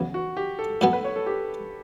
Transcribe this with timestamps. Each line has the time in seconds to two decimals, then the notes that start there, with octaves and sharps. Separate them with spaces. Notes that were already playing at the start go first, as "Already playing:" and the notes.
Already playing: E2 C#3 F#3 B3
0.14 F#4
0.37 G4
0.59 A4
0.81 A2 F#3 B3 A4
0.93 B4
1.04 C#5
1.16 A4
1.26 G4